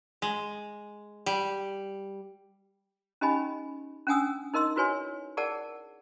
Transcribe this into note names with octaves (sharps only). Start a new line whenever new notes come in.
G#3
G3
C#4 D#4 G4 D#5 G#5 B5
C#4 D4 F#5 G#5 D#6 E6
D#4 A#4 D#5 C6 E6
E4 F#4 B4 C#5 G#5 C6
G#4 A#4 D5 F#5 A5